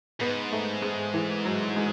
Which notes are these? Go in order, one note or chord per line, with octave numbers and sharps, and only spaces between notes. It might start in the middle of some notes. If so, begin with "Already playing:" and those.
G#2 B3
A3
G#3
E3
F#3
G#3